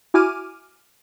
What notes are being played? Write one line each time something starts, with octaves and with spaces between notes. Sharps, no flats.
E4 F#4 G#5 D6 F6 D#7